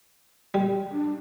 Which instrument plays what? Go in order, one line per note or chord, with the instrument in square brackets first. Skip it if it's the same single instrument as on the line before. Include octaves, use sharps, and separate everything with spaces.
[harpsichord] G3
[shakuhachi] D4